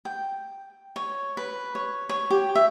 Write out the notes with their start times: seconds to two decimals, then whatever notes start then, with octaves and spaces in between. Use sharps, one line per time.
0.05 G5
0.96 C#5
1.37 B4
1.75 C#5
2.09 C#5
2.30 G4
2.55 E5